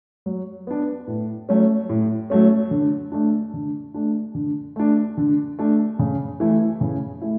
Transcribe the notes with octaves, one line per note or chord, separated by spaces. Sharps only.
F#3
B3 D4
A2
F#3 A3 C#4
A2
F#3 A3 C#4
D3
A3 D4
D3
A3 D4
D3
A3 D4
D3
A3 D4
C#3
E3 A3 E4
C#3
A3 E4